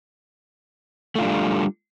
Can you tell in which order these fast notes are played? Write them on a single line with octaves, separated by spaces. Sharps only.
A3 F4 D4 G3